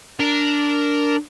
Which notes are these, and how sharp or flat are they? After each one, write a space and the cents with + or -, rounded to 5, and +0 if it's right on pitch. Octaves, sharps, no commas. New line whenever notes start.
D4 -10 A#4 -5